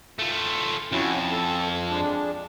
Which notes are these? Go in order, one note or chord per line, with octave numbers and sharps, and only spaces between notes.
A3 F4
F2 C#4 E4 F#4
A4
G#3 D4